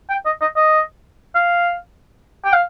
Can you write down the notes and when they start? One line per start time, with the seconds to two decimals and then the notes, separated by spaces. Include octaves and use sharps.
0.10 G5
0.26 D#5
0.41 D#5
0.56 D#5
1.35 F5
2.45 G5
2.53 F5